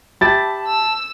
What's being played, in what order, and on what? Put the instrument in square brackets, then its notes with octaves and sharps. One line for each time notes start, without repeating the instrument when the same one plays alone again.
[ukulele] G4 E5 [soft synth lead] A5 [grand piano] B5 A6
[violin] E6